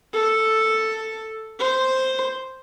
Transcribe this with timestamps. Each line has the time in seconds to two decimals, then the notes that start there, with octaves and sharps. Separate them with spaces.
0.13 A4
1.60 C5